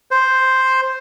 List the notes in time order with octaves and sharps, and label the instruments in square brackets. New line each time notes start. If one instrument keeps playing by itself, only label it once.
[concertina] C5